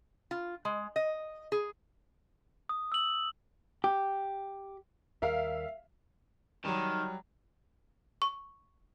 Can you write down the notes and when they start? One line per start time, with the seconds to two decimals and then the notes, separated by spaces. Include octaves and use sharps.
0.31 F4
0.65 G#3
0.96 D#5
1.52 G#4
2.69 D#6
2.92 E6 F#7
3.84 G4
5.22 D#2 G3 A#4 E5 F5
6.65 D#3 F#3 G3
8.22 C#6